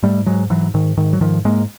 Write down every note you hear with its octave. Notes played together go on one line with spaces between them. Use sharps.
G#2 G3 A3
G#2 F#3 G#3
G#2 E3 F#3
G#2 D#3
G#2 D#3
F#3
G#2 D#3 F3
G#2 G#3 A#3